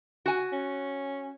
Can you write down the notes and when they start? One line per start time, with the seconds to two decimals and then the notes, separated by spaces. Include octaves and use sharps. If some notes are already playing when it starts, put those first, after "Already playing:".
0.26 F#4 G#5
0.52 C#4